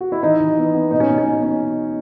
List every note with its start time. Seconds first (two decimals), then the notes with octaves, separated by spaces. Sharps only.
0.01 F#4
0.12 E4
0.23 E3 D#4
0.40 E3
0.58 B3
0.74 B3
0.91 B2 D#4
1.00 C#4
1.09 B2
1.18 C#4
1.26 B2
1.43 C#4